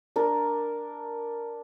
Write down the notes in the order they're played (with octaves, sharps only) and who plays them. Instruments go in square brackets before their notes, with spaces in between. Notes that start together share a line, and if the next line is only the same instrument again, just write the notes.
[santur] D4 A#4